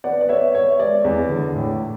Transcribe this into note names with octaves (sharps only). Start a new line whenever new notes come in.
B3 D5 F#5
D5
B3 C#5 E5
B3 C#5 E5
G#3 D5
E2
D3
A2